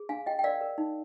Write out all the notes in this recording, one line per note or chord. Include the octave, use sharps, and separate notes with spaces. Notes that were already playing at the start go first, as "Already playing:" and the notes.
Already playing: G#4
D4 F5 G#5
F4 D#5 G5
G5
A#4 D5 F5
A#4
D#4